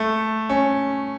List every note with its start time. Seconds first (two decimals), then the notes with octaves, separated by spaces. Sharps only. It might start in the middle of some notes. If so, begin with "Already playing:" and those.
Already playing: A3
0.49 C#4